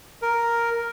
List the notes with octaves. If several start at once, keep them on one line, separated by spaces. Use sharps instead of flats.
A#4